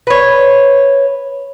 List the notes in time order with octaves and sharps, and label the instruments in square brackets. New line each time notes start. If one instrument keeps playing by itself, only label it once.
[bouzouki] B4 C#5